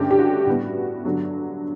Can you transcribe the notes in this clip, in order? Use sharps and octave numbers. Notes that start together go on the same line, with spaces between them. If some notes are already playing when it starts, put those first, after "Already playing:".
Already playing: G2 D3 A3 C#4 G4
G4
F#4
A2 G3 B3
G2 D3 F#3